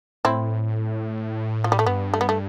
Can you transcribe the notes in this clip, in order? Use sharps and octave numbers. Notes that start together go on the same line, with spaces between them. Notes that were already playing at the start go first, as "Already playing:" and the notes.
A2 C4 E4
F3
G3
A3
G2 B3
A3
B3
A3